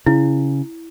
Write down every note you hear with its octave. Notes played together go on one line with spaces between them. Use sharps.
C#3 E4